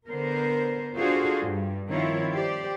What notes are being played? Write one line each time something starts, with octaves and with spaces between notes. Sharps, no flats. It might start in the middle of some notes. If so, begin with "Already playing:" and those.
D3 B3 A#4 C5
D4 F4 F#4 G#4 A4 C5
G2
D#3 F3 C4 E4 F4 C#5
G4 C5 D5